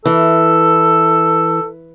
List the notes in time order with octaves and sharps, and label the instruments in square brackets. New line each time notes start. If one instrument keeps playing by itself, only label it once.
[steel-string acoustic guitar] E3 [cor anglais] A4